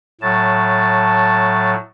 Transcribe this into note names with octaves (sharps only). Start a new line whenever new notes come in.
A2 F#3 A5